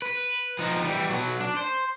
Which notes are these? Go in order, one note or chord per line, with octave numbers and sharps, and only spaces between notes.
B4
F3 D#4
E3 G3
B2 F#3
D4
C5